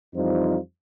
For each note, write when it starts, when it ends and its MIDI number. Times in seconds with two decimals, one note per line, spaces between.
0.15 0.57 41
0.15 0.57 52
0.15 0.57 55
0.15 0.57 63
0.15 0.57 65
0.15 0.57 72